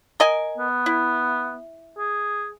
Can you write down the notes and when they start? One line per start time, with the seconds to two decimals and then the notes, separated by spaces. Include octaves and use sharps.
0.20 A#4 D#5 G#5
0.58 B3
0.86 E4
1.98 G#4